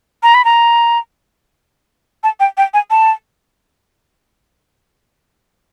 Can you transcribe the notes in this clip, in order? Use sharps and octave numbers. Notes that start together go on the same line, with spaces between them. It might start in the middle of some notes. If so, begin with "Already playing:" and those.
A#5
B5
A#5
A5
G5
G5
G#5
A5